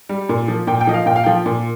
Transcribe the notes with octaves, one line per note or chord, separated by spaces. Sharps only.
G3
A#2
F3
A#2 G5
G5
F3 D#5
F5
A#2 G5
F5
F3 G5
A#2